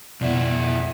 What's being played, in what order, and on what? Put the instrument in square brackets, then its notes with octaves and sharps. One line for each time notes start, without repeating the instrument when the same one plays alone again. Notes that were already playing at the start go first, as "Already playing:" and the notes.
[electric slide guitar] F2 E4 [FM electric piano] B2 D5 F#5